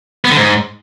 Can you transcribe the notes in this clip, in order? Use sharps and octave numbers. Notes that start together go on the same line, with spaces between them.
B3
D3
G#2